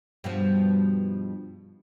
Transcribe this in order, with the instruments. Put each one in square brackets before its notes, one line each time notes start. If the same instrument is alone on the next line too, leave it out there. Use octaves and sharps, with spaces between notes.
[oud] G2 B2 F3